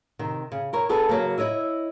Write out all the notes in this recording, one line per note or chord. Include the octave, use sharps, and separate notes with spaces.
C3 D#3
C#3
E4 A#4 C#5
B3 D4 G#4 A4 B4
C#3 F#3 A#3
E4 C#5 D#5 E5